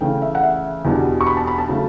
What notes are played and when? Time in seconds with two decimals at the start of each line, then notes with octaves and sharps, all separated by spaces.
0.01 C#3 E3 A3 G5
0.22 E5
0.35 F#5
0.43 E5
0.85 E2 B2 G3 B3 D4
1.21 C#6
1.27 B5
1.37 A5
1.47 B5
1.58 A5
1.69 C#3 F#3 A3